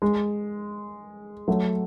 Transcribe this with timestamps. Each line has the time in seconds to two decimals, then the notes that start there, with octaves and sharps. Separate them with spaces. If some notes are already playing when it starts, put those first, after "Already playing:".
0.02 G#3
1.48 F#3 A3